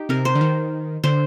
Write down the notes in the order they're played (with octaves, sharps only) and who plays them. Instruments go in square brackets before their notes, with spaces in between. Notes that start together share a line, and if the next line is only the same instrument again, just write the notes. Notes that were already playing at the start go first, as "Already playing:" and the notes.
Already playing: [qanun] D#4 G4
[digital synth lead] C3 [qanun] A#4
[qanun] C5
[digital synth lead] D3
D#3
[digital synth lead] D3 [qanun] C5